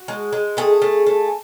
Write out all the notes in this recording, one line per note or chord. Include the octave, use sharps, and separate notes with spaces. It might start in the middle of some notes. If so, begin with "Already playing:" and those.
Already playing: F#4
G#3
G#3
A3 G#4
A3
A3